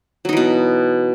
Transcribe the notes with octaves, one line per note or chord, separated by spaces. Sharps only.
B2 E3 F#3 D#4